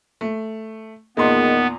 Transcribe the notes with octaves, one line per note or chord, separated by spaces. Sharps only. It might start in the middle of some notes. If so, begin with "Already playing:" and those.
A3
E2 A#2 D#3 G#3 B3 C6